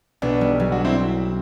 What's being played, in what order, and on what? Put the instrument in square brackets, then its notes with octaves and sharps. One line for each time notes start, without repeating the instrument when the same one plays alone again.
[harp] B1 [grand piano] B3 D4
[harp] G3
F#3
[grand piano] D4 F#4
C4 E4